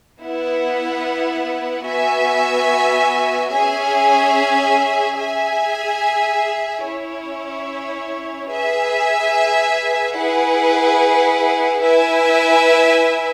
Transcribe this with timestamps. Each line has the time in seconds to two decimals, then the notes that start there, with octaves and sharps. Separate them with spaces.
0.21 B3 E4 B4 F#5
1.86 B3 F#4 E5 G#5
3.52 C#4 G#4 E5 G#5
5.18 G#4 E5 G#5
6.83 C#4 E4 C#5
8.50 G#4 B4 E5 G#5
10.16 E4 G#4 B4 F#5
11.82 E4 B4 E5 G#5